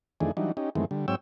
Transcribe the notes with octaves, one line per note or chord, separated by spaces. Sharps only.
F2 D#3 E3 A3 D4 G#4
E3 F#3 G3 D4 D#4
C#4 D#4 G4
F#2 D#3 E3 G#3 A3 C4
D3 G3
G#2 F#3 C4 C#5 G5 E6